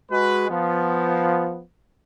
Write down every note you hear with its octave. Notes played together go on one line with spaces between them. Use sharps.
G#3 F#4 B4
F3 B3